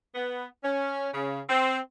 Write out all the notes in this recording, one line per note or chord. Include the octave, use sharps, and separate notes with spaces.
B3
C#4
C#3
C4